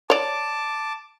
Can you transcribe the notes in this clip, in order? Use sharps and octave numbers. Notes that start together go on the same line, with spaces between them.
C#5 D5 A5 D6